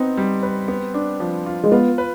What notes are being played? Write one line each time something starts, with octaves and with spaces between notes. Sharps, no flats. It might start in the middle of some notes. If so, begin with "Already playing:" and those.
Already playing: B3 C4 D#4
G3
B4
B3
D4
F3
F4
G#3
B3 F4
B4